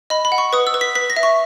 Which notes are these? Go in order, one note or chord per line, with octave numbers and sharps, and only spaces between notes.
D#5 B5
B5
F#5
C#6
B4 D#6
E6
B4
B6
B4 B6
A#6
E5
C#6